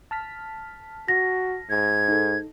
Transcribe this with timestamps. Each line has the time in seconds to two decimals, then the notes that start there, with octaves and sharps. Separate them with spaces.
0.11 A5 F6 B6
1.08 F#4 A#6
1.70 G#2 G#6
2.08 D#4 A4